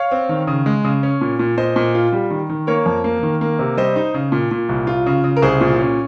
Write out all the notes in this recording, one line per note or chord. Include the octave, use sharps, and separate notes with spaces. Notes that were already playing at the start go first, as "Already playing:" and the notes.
Already playing: C#5 F5
C4
D#3
C#3
G#3
C#3
C#4
A#2
A#2
A#2 C5 D#5
A#2
F4
G3
D#3
D#3
A#3 A#4 C#5
F2
A#3
D#3
A#3
C3
G3 C5 D#5
D#4
C#3
A#2
A#2
C2
F4
C#3
C#3
A#4
C2 G#4 C5
A#2
C#4